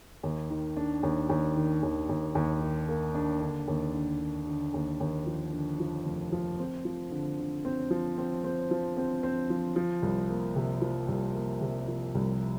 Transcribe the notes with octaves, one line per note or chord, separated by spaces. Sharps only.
D#2
D#3
D4
D#2
D#2
D#3
D#2
D#2
D#2
D#3
A#3
D4
D3
D#2
D3
D3
D3
D#2
D#2
F3
D3
F3
F1
F3
C4
F3
D3
D3
C4
F3
C4
C4
F3
C4
C4
F3
F3
C2
A#3
C3
F3
C2
A#3
C3
F3
C2